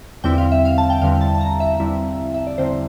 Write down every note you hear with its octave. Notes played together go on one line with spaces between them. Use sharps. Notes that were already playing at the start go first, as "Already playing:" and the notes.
E2 D3 G3 C4 E4 G5
F5
E5
F5
A5
G5
E2 D3 G3 C4 E4 F5
A5
A5
A#5
E5
E2 D3 G3 C4 E4
E5
D5
E2 D3 G3 C4 E4 C5